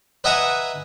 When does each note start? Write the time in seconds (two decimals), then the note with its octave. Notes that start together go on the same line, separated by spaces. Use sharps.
0.24 B4 D#5 E5 F#5 G#5 A#5